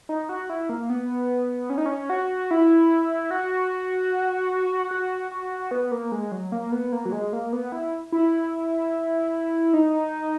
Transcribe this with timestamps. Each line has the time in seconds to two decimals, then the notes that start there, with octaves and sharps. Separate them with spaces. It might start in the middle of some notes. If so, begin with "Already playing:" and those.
0.09 D#4
0.29 F#4
0.50 E4
0.69 A#3
0.90 B3
1.70 C#4
1.78 D#4
1.86 C#4
2.10 F#4
2.51 E4
3.31 F#4
4.91 F#4
5.31 F#4
5.71 B3
5.91 A#3
6.12 G#3
6.32 F#3
6.52 A#3
6.72 B3
6.92 A#3
7.06 F#3
7.12 G#3
7.33 A#3
7.53 B3
7.72 E4
8.12 E4
9.74 D#4